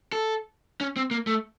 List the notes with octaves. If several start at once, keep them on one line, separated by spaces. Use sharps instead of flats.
A4
C#4
C4
A#3
A3